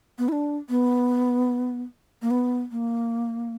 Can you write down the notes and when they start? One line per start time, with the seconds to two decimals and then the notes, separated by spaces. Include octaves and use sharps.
0.18 B3
0.29 E4
0.32 D4
0.69 B3
2.22 A#3
2.31 B3
2.72 A#3